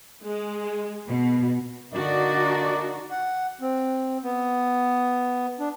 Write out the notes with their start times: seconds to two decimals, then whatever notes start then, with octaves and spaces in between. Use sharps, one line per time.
0.24 G#3
1.08 B2
1.93 D3 A#3 D4 D#4 F#4 D5
3.11 F#5
3.61 C4
4.23 B3
5.60 D4